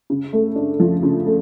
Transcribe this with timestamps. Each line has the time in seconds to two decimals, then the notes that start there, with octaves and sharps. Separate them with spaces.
0.10 C#3
0.33 A3
0.56 D4
0.80 F3
1.03 C#3
1.26 A3